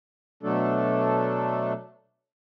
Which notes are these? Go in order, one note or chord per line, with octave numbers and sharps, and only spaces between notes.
B2 F#3 A3 D4 A4